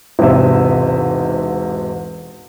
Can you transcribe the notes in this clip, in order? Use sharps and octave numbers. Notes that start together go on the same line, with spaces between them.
E1 G#2 C3 E5